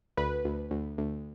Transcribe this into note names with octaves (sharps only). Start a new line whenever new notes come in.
D2 B4
D2
D2
D2